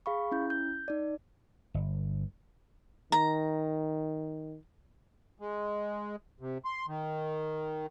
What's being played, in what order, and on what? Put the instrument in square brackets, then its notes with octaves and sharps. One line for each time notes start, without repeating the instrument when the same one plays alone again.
[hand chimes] G#4 F5 B5 C#6
C#4 E4 G6
G6
D#4 D5
[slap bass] G1
[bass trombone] D#3 [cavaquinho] A#5
[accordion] G#3
C3
C6
D#3